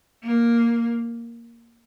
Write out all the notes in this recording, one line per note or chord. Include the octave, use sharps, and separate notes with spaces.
A#3